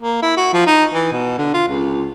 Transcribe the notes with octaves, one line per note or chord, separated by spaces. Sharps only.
A#3
E4
F#4
F3
D#4
E3
B2
D3
F4
C#2